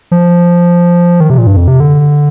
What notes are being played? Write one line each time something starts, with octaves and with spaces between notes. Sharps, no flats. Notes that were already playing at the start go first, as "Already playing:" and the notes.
F3
D#3
C3
A#2
G2
F2
C3
D3